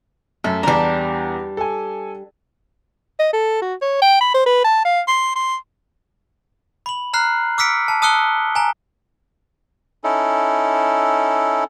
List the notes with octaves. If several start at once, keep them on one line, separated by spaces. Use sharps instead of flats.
F#2 A3
E2 G3 D4 A#5
A4 G#5
D#5
A4
F#4
C#5
G5
B5
C5
B4
A5
F5
C6
C6
B5 F#7
A#5 F6 F#6 C7
D6 E6 F6 B6 C#7 D7
A5
A5 D#6 E6 F#6 C#7 G7
G#5 A#5
C#4 D#4 E4 A4